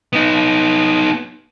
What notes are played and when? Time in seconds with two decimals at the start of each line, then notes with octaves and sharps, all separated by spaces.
0.13 B3 D#4